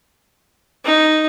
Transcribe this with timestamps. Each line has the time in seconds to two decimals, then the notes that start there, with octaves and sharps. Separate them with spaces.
0.84 D#4